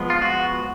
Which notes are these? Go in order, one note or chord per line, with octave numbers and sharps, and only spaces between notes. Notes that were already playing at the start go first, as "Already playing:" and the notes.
Already playing: F3 G#3 B3
F4
F#4